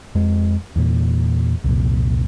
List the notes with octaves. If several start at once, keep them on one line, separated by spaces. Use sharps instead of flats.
F2 G#3
E2 A#2
C2 F2 A#2